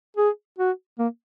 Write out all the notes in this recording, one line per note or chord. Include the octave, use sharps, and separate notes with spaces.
G#4
F#4
A#3